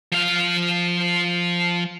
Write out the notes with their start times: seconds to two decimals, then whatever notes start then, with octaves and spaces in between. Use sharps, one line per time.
0.12 F3 F5